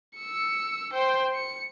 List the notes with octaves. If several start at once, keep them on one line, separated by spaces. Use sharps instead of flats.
E6 C#7
C5 G5
C#7